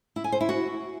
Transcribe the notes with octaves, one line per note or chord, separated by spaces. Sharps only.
E4
G#5
C5
E4
F#4